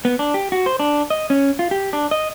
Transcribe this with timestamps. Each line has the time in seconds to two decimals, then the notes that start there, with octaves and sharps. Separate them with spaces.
0.05 B3
0.19 D4
0.34 G4
0.52 F#4
0.66 C5
0.80 D4
1.10 D#5
1.30 C#4
1.59 F4
1.71 G4
1.93 D4
2.11 D#5